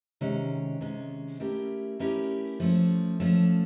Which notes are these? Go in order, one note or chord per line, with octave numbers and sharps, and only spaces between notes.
C3 D#3 G#3 C#4
C3 D#3 G#3 C#4
A3 C#4 E4 G4 A#4
A3 C#4 E4 G4 A#4
F3 A3 C#4
F3 A3 C#4